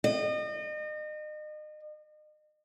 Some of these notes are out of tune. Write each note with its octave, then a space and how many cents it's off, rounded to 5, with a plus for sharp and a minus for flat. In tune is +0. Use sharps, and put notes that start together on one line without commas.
D#5 -35